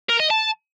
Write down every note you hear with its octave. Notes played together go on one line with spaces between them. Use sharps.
A#4
D#5
A5